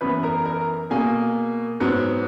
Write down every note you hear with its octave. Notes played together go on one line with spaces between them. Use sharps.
F#2 E3 B3 B4 B5
A#4 A#5
A#4 A#5
B2 A#3 G#4 G#5
G#2 F#3 B3